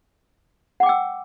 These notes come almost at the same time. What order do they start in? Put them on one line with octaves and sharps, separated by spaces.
F#5 D6 G5 E6